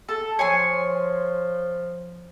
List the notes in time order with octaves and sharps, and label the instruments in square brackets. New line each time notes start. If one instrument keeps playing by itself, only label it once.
[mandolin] A4
[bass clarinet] F3 [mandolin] C#5 G#5 C6